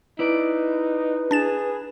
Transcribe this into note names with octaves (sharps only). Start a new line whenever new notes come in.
D#4 E4 B4 D5
D4 G#4 A6 E7